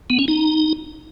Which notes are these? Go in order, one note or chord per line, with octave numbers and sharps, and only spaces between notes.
B3
C#4
D#4